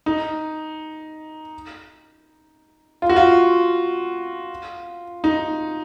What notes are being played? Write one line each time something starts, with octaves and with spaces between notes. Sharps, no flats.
D#4
F4
F#4
F4
D#4